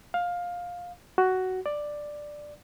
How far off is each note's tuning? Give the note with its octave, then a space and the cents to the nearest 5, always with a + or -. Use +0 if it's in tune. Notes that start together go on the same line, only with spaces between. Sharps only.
F5 +15
F#4 +10
D5 +5